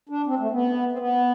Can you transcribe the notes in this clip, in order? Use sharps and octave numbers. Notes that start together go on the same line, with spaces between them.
D4
C4
A3
B3
C4
B3